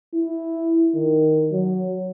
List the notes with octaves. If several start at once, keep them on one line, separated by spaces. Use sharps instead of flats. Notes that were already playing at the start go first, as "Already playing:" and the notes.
E4
D#3
F#3